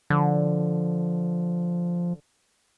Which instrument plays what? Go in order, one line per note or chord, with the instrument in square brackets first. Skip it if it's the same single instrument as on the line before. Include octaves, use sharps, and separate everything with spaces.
[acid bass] D3 [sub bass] F3